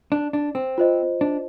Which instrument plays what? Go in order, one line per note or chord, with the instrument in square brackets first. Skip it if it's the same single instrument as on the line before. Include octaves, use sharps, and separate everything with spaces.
[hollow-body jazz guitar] D4
D4
C4
[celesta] F4 C5 D#5
[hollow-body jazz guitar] D4